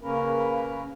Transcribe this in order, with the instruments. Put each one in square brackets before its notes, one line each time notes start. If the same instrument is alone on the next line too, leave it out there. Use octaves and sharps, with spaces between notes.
[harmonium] C#3 A#3 C#4 A#4 B4